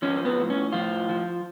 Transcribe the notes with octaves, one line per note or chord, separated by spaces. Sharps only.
F3 C#4
B3
A2
C#4
A2 F3 F4
F3